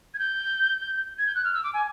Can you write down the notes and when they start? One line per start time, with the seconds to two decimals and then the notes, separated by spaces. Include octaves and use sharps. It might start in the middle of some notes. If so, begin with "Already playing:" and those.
0.14 G#6
0.19 G6
1.18 G#6
1.27 G6
1.35 F#6
1.44 F6
1.54 E6
1.64 D6
1.74 G#5